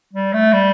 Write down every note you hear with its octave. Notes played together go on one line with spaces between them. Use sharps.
G3
A3
G3